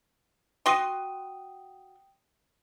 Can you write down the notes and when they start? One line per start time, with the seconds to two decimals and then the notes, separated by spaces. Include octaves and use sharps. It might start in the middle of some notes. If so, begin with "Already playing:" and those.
0.66 F#4 G5 C6 D#6 D#7